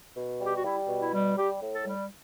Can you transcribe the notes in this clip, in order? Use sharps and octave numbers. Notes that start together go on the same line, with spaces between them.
B2
G3
G4
F#4
G3 E4
B2
E4
G3
G3 G4
A2
A4
G3